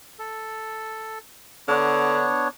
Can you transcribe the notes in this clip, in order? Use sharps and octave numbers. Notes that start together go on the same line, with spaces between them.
A4
D3 B3 D4 C#5